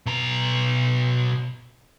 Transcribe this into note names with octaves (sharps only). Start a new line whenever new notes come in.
B2 A#5